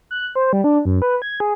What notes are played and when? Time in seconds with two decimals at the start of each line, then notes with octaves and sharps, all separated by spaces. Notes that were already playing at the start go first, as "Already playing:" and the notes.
0.11 F#6
0.35 C5
0.53 G3
0.64 D4
0.85 F#2
1.02 B4
1.22 G#6
1.40 G#4